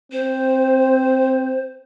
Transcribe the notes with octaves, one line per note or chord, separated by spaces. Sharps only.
C4 C5